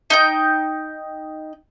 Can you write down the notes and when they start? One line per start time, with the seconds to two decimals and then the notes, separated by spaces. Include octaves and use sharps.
0.10 D#4 G5 G6